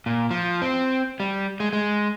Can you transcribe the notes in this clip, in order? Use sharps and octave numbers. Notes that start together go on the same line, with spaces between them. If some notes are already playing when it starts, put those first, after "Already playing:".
A#2
F3
C4
G3
G#3
G#3